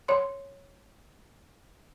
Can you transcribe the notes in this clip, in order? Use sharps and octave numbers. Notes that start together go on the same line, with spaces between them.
C#5 C6